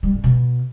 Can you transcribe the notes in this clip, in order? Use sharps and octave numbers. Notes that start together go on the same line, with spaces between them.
G3
G#2
B2